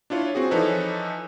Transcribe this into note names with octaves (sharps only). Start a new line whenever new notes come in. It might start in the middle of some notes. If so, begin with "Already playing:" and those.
D4 E4 F4 C#5
C4 F#4 G#4
E3 F3 D#4 A4 B4 C#5